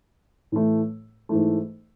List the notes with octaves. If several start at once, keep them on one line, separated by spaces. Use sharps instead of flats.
A2 E3 A3
G#2 E3 A3